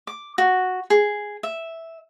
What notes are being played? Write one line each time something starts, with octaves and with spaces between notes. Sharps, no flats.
D6
F#4
G#4
E5